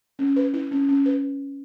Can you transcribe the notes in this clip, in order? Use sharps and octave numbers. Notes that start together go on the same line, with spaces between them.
C#4
B4
E4
C#4
C#4
B4